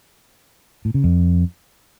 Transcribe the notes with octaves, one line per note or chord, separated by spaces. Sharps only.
A2
C#3
F2